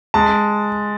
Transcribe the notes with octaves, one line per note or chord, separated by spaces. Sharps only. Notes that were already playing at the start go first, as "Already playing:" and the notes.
G#3 A5